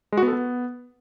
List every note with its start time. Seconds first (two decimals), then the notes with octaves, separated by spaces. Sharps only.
0.12 G#3
0.17 F#4
0.23 B3
0.28 A4
0.33 B3